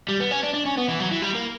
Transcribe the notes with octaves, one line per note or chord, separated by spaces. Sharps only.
G3
B3
C#4
D4
D4
C#4
B3
E3
F#3
E3
G3
A#3